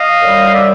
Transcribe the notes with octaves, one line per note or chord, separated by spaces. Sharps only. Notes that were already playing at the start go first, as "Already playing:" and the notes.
Already playing: D#5 F5
F#2 D3 G3
D5 E5